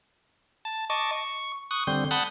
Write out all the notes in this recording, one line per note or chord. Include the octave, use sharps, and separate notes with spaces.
A5
D#5 A5 C#6 D6
C#6
C#6 D#6 F#6
D3 G3 C4 G6
F#5 A5 B5 D#6 F#6 G6